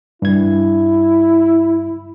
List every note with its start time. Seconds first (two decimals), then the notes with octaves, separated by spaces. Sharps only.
0.22 G2 E4 G#6